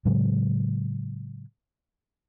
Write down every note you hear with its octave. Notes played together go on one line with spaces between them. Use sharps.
A2 C#3 F#3 G#3